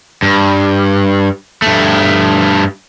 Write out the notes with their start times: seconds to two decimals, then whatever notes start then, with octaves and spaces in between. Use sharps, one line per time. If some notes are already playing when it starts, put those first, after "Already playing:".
0.23 G2
1.62 G2 A3